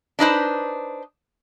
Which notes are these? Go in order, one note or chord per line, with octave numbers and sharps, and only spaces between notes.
D4 D#4 B4 C5